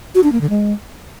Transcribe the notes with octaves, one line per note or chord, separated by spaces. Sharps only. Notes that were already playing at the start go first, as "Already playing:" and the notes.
F#4
D4
A#3
D3
G#3